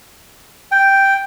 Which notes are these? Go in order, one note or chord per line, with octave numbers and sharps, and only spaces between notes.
G5